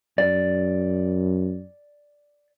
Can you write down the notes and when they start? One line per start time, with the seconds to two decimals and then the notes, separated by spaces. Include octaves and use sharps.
0.18 F#2 D5